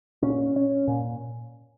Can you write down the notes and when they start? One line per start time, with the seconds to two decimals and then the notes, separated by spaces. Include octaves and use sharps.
0.22 A#2 C#4
0.56 C#4
0.88 A#2